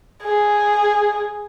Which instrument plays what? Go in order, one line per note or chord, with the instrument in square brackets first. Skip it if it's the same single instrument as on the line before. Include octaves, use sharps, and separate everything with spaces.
[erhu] G#4